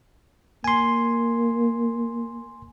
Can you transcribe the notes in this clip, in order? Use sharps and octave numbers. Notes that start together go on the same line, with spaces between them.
A#3 G#5 C6